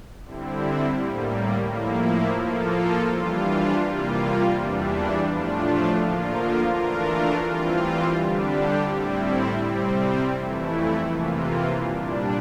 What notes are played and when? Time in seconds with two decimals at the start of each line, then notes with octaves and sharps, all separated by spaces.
0.24 D3 G3 C4 E4
0.96 A2 G3 A#3
1.69 A2 F3 A#3 E4
2.41 F3 A#3 F4 A4
3.14 E3 G3 D4 F4
3.86 C3 G3 A#3 F4
4.58 E2 E3 G3 D4
5.29 A2 F3 A3 D4 F4
6.03 D3 F3 A#3 F4 A#4
6.74 E3 A3 D4 F4 A#4
7.47 E3 G3 C4 F4
8.19 D3 G3 D4 G4
8.91 A2 G3 C4 E4
9.63 C3 G3 C4
10.36 F2 E3 A3 E4
11.08 C3 E3 A#3 F4
11.79 A#2 G3 D4